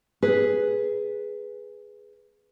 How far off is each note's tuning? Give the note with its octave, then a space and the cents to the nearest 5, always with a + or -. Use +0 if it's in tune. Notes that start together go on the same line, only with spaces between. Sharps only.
G#4 +0 B4 +0